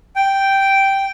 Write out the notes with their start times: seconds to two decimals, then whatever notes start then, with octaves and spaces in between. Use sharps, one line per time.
0.16 G5